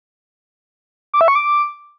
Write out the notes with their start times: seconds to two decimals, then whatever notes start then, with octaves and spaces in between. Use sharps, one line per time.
1.14 D6
1.21 E5
1.28 C#6
1.35 D6